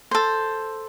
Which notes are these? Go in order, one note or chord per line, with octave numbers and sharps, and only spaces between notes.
A4 C5